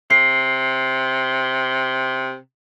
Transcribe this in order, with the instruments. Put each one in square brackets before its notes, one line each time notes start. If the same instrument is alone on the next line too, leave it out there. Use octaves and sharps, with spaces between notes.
[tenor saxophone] C3 [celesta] C7